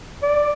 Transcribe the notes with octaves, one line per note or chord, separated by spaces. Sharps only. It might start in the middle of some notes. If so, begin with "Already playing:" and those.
D5